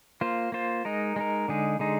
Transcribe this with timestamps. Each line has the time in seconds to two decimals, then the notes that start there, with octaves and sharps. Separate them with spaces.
0.21 A#3 F4 C5
0.52 A#3 F4 C5
0.85 G#3 D#4 A#4
1.16 G#3 D#4 A#4
1.48 D3 G#3 D#4 G#4
1.79 D3 G#3 D#4 G#4